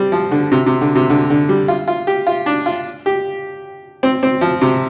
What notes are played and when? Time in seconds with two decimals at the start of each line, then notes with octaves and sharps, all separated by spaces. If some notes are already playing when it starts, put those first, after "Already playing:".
Already playing: G3 C4
0.12 F3
0.31 D3
0.52 C3
0.66 C3
0.81 D3
0.96 C3
1.10 D3
1.30 D3
1.49 G3
1.68 F4
1.88 F4
2.07 G4
2.27 F4
2.46 D4
2.66 F4
3.06 G4
4.03 C4
4.23 C4
4.41 F3
4.61 C3